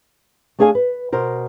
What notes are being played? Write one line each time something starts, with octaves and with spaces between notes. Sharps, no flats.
A3 D4 G#4 F5 G#5
B4
B2 A#4 C5